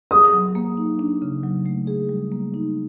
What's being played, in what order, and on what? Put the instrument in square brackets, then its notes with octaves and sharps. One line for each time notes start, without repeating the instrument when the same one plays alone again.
[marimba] G#4 [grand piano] D#6
[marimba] F#3
A#3
D#4
D4
C#3
F#3
A3
G#4
G3
A#3
D#4